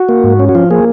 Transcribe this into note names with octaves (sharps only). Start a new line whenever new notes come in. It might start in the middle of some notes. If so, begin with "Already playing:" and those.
Already playing: F#4
A#3
G#2
C#4
F#4
F3 F4
A#3 G#4